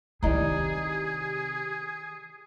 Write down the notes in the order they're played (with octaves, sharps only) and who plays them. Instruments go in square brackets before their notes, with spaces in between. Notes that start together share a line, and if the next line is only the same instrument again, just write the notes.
[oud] C3 D#4 [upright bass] D#3 E4 [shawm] G#4 [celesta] D5 D#5 A#5